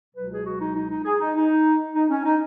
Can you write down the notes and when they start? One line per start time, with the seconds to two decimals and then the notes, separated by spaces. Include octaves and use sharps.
0.15 C#2 B2 F#3 B4
0.31 G#4
0.46 F#4
0.61 D#4
0.75 D#4
0.90 D#4
1.05 G#4
1.20 D#4
1.35 D#4
1.95 D#4
2.10 C#4
2.25 D#4